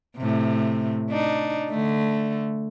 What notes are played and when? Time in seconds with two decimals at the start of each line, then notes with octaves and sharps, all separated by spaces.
0.17 A2 C3
1.10 D4 D#4
1.69 D3 A3